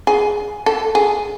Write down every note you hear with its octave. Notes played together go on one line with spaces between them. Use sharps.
G#4
A4
G#4